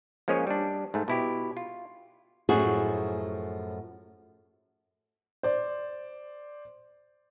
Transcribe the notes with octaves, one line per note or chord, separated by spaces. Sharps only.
F3 G#3 A#3 C#4 G#4 C#5
G3 D4
G#2 A3
B2 E4 G4
F4
F#2 A2 F3 F#4 G#4
C5 D5